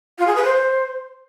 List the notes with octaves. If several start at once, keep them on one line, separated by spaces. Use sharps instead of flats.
F4
G#4
B4
C5